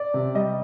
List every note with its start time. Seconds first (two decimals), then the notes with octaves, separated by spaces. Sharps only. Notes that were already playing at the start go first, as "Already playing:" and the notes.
Already playing: D5
0.14 C3
0.35 G3 D#5